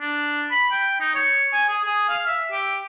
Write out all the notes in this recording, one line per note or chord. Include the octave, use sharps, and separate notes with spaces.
D4
B5
G5
D#4
C#5
G#5
G#4
G#4
F5
E5
G4